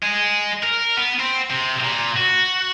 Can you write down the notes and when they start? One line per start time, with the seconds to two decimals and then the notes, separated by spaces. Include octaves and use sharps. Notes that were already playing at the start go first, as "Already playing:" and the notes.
0.03 G#3
0.63 A#4
0.97 B3
1.19 C4
1.50 C3
1.83 A#2
2.16 F#4